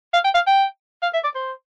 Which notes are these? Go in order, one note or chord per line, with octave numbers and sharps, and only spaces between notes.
F5
G5
F5
G5
F5
E5
D5
C5